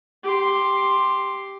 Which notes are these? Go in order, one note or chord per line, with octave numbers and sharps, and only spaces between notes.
G4 C6